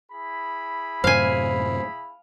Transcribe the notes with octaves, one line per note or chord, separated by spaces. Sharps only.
E4 G#4 B5
F#2 A2 C3 C5 F5 G#5 C7